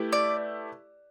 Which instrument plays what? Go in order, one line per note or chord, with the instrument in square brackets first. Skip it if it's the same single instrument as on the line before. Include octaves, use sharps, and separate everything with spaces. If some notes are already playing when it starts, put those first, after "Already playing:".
Already playing: [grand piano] A3 E4 G4 B4
[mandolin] D5